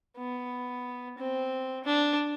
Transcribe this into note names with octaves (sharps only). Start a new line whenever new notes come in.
B3
C4
D4